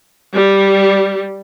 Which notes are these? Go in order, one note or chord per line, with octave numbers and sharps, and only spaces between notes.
G3